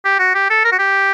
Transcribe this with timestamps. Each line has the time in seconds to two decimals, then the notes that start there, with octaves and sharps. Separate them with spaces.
0.05 G4
0.19 F#4
0.35 G4
0.50 A4
0.65 A#4
0.72 F#4
0.79 G4